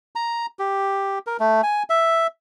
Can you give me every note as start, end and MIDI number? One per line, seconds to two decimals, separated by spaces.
0.16 0.46 82
0.59 1.19 67
1.27 1.37 70
1.40 1.61 57
1.63 1.83 80
1.90 2.27 76